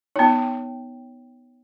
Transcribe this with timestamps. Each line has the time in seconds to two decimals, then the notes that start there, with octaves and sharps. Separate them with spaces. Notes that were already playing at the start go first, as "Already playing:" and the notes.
0.16 B3 D#4 C#5 G5